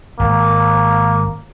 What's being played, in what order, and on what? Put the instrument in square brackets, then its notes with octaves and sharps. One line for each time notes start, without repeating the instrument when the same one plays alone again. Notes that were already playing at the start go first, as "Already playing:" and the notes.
[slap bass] G#1 [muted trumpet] A#3